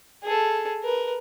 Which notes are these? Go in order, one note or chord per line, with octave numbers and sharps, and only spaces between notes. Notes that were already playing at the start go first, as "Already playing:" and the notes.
G#4 A4
A#4 B4